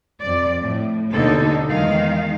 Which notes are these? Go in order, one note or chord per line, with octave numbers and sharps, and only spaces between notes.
F2 D5
A2
D#2 B2 D3 A#3 D#4 A4
E2 D#3 G#3 D#4 F5